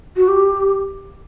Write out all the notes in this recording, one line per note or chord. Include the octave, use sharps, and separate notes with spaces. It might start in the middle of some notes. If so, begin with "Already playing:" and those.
F#4
G4